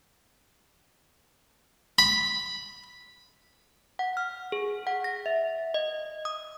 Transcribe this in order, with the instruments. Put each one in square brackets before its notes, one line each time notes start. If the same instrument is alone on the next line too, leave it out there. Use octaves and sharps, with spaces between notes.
[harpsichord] B5
[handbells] F#5
F6
G#4
F#5
A#6
E5
D#5
D#6